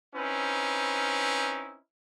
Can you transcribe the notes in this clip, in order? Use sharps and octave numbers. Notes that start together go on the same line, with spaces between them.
C4 C#4 D#4 E4 B4